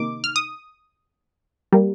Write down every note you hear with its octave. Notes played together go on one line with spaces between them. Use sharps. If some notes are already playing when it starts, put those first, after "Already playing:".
Already playing: C3 D#3 A#3 D#4 D6
F6
D#6
G3 A#3